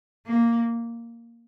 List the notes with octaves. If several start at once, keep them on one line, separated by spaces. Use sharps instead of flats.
A#3